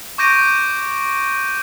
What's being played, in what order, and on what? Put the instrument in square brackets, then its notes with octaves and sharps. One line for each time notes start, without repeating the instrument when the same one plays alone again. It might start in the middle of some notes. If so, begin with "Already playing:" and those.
[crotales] C#6 D6 G6 A#6 D7 D#7